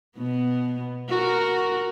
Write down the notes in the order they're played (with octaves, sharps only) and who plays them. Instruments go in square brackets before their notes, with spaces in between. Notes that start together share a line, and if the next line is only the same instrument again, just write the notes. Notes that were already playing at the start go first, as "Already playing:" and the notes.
[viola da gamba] B2 B3
F#4 A#4